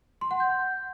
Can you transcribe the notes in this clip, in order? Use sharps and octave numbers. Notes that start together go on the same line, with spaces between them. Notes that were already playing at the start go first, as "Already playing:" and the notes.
C6
F#5
G6